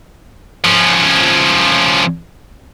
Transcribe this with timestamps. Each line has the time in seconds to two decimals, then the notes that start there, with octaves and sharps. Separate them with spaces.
0.64 F3 C#4